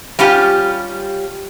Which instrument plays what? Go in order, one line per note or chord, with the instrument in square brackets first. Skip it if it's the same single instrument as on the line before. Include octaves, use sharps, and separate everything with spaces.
[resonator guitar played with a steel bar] G3 C#4 F4 G4